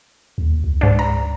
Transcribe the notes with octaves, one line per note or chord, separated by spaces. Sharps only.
D#2
C#2
G#2 D4
A#5